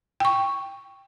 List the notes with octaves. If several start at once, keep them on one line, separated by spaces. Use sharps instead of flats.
G5 C#6